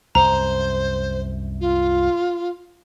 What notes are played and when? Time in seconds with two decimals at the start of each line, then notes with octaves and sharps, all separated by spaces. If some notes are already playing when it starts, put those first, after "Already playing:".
0.15 C2 F#2 C5 A#5
1.60 F4